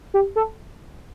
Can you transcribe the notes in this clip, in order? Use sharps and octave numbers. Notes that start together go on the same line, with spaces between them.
G4
A4